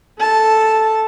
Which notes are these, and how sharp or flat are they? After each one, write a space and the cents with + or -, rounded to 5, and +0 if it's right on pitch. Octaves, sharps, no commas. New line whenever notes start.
A4 +0 A5 -5